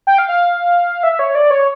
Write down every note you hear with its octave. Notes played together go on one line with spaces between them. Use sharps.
G5
F5
F5
E5
C#5
D5
C#5